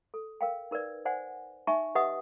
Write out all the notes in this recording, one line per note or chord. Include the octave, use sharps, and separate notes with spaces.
A4
A#4 F5 G5
D#4 A#4 B4 D5
C5 D5 F#5 G#5
D#4 E5 G#5 A5 C#6
G4 B4 D#5 E5 F#5 D#6